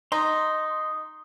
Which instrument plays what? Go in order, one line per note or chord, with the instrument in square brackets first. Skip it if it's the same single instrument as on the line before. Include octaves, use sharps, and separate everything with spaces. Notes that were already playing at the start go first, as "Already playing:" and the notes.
[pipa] D#4 [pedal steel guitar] C6 [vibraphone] D#6